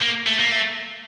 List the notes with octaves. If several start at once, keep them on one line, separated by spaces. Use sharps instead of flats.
A#3
A3
A#3
A3